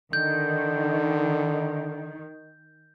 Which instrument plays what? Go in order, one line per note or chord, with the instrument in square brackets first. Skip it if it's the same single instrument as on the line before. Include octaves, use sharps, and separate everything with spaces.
[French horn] D3 [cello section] D#3 [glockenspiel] G6